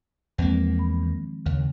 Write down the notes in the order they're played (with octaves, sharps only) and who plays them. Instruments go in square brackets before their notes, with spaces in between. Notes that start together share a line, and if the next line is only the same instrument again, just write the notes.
[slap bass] E2 A#3 [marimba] F3 G#3 C4
[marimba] B5
D#3
[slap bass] D#2 [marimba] C#3